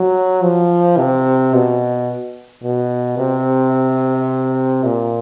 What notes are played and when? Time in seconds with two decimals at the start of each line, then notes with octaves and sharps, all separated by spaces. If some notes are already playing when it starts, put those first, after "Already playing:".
Already playing: F#3
0.42 F3
0.97 C3
1.54 B2
2.64 B2
3.18 C3
4.84 A#2